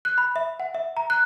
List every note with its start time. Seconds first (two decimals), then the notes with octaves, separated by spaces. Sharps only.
0.05 F#6
0.18 B5
0.36 E5
0.60 F#5
0.75 E5
0.97 A#5
1.10 F#6